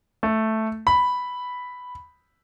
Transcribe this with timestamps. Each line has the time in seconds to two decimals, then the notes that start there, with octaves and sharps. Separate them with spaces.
0.23 A3
0.87 B5